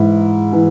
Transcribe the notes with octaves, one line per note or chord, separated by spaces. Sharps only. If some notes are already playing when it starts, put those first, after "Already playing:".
Already playing: G#2 E3 E4
E3